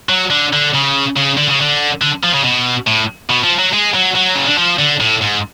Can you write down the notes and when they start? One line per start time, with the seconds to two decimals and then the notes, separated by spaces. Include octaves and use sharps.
0.09 F#3
0.30 D3
0.53 D3
0.74 C#3
1.16 C#3
1.37 D3
1.48 C#3
1.60 D3
2.02 D3
2.24 F3
2.34 C#3
2.45 B2
2.87 A2
3.30 B2
3.44 F3
3.59 F#3
3.73 G#3
3.94 F#3
4.15 F#3
4.35 C#3
4.46 D3
4.58 F3
4.79 D3
5.00 A2
5.22 G#2